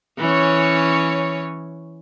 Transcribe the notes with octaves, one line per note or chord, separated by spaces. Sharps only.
E3 C#4 C#5